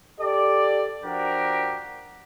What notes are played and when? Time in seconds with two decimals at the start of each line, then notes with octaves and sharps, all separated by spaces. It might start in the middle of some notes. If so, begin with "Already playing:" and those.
0.20 G4 A4 D5
1.04 F3 D4 F#4 G4 A#4